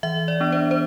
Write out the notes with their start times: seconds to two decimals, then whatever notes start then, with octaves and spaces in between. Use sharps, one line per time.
0.03 E3 E5
0.28 D5
0.40 B3 D4
0.52 C5
0.71 C5